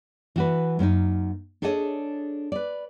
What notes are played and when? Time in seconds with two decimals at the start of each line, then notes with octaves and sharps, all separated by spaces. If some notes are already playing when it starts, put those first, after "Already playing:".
0.36 E3 F#4 B4
0.79 F#2 A#3 C4 D#4
1.62 D4 G#4 A4 C#5 D#5
2.52 B4 D5